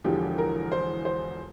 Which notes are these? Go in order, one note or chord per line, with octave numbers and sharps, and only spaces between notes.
E1 E2 D3 F3 G4
A#4
C5
C5